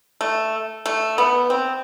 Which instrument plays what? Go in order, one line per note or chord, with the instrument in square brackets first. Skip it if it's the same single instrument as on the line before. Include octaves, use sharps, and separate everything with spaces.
[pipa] A3
A3
B3
C4